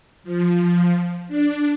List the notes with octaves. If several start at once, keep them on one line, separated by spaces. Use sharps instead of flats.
F3
D4